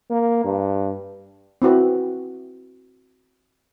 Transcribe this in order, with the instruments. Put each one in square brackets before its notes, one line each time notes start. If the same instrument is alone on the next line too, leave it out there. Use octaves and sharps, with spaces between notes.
[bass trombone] A#3
G2
[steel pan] C4 E4 F#4 B4